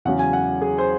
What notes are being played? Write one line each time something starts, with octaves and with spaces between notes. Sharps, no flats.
E2 C#3 F#3 F#5
G#5
F#5
G#4
C5